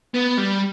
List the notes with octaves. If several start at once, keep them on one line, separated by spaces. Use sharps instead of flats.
B3
G3